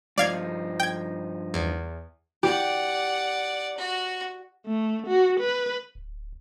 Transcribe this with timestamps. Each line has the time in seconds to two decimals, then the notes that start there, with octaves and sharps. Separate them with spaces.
0.18 G2 F3 D#4 D5 F5 G#6
0.80 G5 G#6
1.54 E2
2.43 G4 D5 F#5
3.77 F#4
4.67 A3
5.07 F#4
5.40 B4
5.95 D1